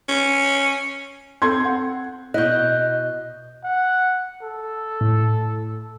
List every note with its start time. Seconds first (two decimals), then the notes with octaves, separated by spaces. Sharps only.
0.09 C#4
1.42 C4 A4 C6 G#6
1.60 C4 F#5
2.34 B2 E4 D#5 F#6 G6
3.64 F#5
4.42 A4
5.01 A2